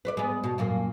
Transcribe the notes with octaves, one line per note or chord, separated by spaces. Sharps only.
B4 C5 D5
G#3 B3
B2
F#2 A#2 A#3